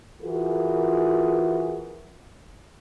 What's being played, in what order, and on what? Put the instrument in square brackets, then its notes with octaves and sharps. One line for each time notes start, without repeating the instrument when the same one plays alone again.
[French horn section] E3 F4 F#4 G#4 A#4